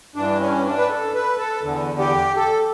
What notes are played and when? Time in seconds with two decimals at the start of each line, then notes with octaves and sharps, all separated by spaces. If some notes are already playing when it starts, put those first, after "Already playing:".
0.16 G2 E3 D4
0.40 C#4
0.65 D4
0.78 B4
0.90 A4
1.14 B4
1.38 A4
1.63 E2 D3
1.99 G4
2.36 A4